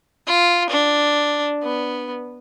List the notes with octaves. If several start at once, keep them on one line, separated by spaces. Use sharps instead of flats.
F4
D4
B3